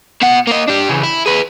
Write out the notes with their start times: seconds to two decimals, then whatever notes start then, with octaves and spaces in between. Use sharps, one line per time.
0.22 B2 F#5
0.47 A#3 D#5
0.68 D4 G4
0.89 C#3 E3
1.04 E4
1.26 G#4 B4